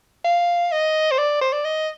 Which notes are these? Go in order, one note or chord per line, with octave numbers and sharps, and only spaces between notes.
F5
D#5
C5
D5
C5
D5
D#5